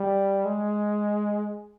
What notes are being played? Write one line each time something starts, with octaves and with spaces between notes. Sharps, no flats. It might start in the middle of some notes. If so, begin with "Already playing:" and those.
Already playing: G3
G#3